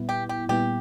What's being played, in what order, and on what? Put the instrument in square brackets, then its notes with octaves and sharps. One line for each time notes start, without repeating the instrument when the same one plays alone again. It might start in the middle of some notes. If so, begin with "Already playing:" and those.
Already playing: [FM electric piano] A#2 G3 B3 E4
[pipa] G4
G4
[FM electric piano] A#2 G3 B3 E4 [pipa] G4